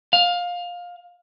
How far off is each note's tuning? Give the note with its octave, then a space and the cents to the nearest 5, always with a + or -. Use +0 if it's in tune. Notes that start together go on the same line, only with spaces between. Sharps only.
F5 +20